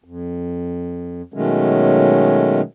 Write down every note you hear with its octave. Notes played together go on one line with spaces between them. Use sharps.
F2
B2 D#3 F#3 G#3 A3 C#4